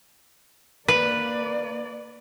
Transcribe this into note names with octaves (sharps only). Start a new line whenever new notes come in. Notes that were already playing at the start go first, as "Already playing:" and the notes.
A#3 B4 D5